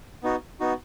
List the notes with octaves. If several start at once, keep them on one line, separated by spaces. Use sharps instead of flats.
B3 D#4 F#4
B3 D#4 F#4